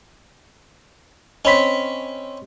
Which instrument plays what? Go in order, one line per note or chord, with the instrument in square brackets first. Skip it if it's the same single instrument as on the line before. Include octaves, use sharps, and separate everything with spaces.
[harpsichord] C4 C#4 [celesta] D#5 B5 B6